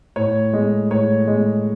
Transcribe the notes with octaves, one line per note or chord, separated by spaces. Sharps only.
A2 C#5
G#3
A2 C#5
G#3